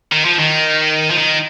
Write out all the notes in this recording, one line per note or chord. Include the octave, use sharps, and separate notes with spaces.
D#3
F3
D#3
F3
D#3